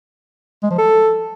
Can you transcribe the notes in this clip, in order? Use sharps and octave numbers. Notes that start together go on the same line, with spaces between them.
G#3
F3
A4